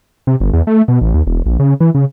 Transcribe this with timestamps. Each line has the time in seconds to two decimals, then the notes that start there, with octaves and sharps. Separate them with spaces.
0.27 C3
0.40 G1
0.53 E2
0.67 A3
0.88 B2
1.01 A1
1.14 D#2
1.27 E1
1.46 A#1
1.59 C#3
1.81 E3
1.95 C#3